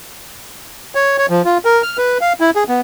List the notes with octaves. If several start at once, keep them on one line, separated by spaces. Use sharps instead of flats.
C#5
C#5
F3
F4
A#4
F6
B4
F5
E4
G#4
B3